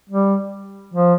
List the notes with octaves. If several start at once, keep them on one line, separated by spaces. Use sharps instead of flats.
G3
F3